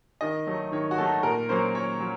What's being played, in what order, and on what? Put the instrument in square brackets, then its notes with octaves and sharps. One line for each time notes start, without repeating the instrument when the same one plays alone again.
[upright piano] D#3 D#5
F#3 A3 D#4
D#3 C#5
F#4
F#3 A3 D#4 A4
A#2 A#4
F#3 A#3 C#4 C5
A#2 C#5
F#3